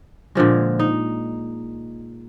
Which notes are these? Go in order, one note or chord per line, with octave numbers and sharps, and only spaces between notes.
A#2 D3 F3 G#3
D#4